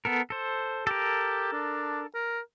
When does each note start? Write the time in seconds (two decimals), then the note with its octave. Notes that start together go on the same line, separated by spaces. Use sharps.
0.05 B3 A4 A#4
0.30 A4 C5
0.87 G4 A4 A#4
1.53 D4
2.15 A#4